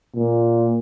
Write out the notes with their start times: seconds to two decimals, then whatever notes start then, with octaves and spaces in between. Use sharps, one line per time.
0.16 A#2